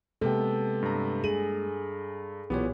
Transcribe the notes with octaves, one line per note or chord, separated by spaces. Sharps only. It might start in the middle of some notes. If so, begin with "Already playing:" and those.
C3 G#3 A#3 B3 A4 G5
G2 A#5
G#4 D#7 F#7
B1 A#2 E3 B3 G4 C#5